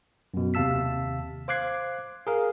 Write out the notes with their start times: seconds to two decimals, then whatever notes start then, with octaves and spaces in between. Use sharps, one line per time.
0.34 F#2 B2
0.54 D#2 C3 F5 A5 E6 B6
1.48 C5 F5 D6 F#6 G#6 C7
2.27 G#4 A#4 F5